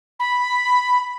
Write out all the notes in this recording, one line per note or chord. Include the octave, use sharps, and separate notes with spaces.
B5